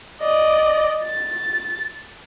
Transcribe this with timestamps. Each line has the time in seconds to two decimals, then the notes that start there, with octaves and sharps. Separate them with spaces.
0.22 D5 D#5
1.06 A6